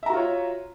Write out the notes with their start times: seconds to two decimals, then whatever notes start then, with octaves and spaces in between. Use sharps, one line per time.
0.03 E5
0.06 A#5
0.10 F#4
0.13 F4
0.17 C#5